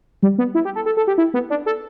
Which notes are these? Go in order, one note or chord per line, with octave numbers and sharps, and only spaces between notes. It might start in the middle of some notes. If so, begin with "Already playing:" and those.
G3
B3
E4
G4
A4
A4
A4
G4
E4
B3
D4
A4